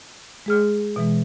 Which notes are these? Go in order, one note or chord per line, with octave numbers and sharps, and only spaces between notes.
G#3 G#4 F6
B2 E3 G#3